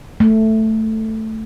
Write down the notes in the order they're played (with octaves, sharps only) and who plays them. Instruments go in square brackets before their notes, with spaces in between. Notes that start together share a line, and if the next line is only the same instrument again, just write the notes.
[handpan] A3